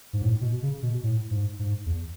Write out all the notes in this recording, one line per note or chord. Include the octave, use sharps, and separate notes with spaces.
G#2
A2
B2
C#3
B2
A2
G#2
G#2
E2